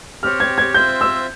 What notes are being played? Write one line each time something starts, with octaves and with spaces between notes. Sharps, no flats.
C4 G4 C#5 F6
G#6
G#6
C4 F4 C5 E5 G6
E6